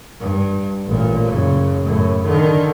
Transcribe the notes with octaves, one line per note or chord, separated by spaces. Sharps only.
G2
A1 A#2
F#1 C#3
F#2 A2
D3 D#3